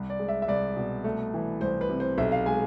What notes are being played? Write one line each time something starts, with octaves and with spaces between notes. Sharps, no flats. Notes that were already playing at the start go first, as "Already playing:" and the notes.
Already playing: C2
D5
G#3
E5
E5
C2 D5
B2
A3
E3
C2 C5
B4
C3
C5
B1 E5
F5
G#3 G#5